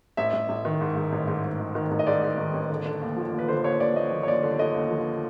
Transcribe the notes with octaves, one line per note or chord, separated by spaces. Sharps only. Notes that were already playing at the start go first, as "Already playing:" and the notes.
A1 E5
A1
A1
D#3
G#2
G#2
A1
G#2
G#2
D#3
D#3
A1
D#5
G#2 D5
G#2
D#3
A1
D3
D3
D#2
F3
D#2
B4
D3 C5
D#2 C#5
D#2 D5
D#2 D#5
F3
C#5
D#2 D5
D3
D3 D#5
D#2
F3